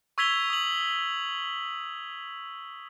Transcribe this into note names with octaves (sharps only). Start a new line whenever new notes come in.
C#6 E6 G#6 B6 F7 G7
D#6 F#7